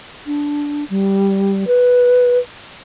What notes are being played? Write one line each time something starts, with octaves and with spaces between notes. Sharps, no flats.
D4
G3
B4